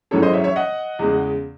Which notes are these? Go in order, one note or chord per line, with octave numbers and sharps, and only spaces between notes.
G#1 F#2 E3 G#3 C#4 A4 C#5
C5 D#5
C#5 E5
C#5 E5
D#5 F#5
E2 C#3 G#3